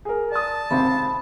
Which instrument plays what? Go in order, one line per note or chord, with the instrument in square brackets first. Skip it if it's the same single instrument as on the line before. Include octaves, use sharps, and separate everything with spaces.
[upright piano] G#4 A#4
[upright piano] D5 D#6 [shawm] A5
[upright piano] G#1 C#2 [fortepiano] C3 C4 [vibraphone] B5